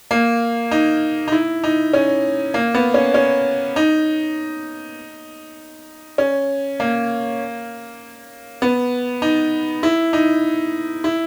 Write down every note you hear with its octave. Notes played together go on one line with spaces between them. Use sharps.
A#3
D#4
D#4
E4
D#4
C#4
A#3
B3
C#4
C#4
D#4
C#4
A#3
B3
D#4
E4
D#4
E4